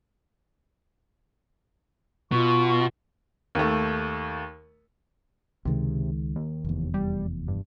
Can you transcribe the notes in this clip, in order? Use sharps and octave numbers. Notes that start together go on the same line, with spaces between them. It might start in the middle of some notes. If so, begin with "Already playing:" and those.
B2 F4 C#6
D#2 A3
C#2 C3 D#3 G#3
D#2
F1 E2
G3
G2